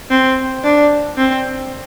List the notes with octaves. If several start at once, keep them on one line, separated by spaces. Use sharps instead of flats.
C4
D4
C4